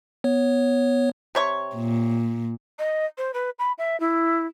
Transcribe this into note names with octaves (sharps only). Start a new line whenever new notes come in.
B3 C#5
C3 C#5 C#6
A#2
D#5
C5
B4
B5
E5
E4